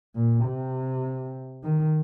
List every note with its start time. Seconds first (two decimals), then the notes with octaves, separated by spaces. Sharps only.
0.15 A#2
0.45 C3
1.64 D#3